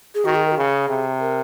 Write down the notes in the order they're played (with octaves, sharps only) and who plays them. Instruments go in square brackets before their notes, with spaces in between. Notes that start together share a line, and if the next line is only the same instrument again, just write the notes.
[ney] G#4
[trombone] D#3 [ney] F#4
[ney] G#4
A#4
F#4
[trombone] C#3 [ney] G#4
[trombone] C3
[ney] A#4